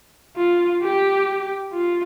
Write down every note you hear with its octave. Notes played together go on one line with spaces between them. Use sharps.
F4
G4
F4